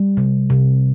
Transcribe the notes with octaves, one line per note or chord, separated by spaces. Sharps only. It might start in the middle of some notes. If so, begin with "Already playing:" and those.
Already playing: G3
C3
C3